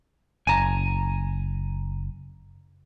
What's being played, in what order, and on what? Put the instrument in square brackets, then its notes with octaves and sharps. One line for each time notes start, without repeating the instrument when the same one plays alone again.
[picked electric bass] F#1 [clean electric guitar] G#5 A#5